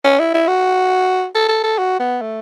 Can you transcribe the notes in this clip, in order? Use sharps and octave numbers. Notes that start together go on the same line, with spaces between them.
C#4
E4
E4
F#4
A4
A4
A4
F#4
B3
A3